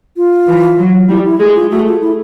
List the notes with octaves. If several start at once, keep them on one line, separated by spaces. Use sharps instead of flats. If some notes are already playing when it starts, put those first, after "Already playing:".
F4
E3
F#3
G3 E4
E4
G#3
F4
A3 F#4
F4
E4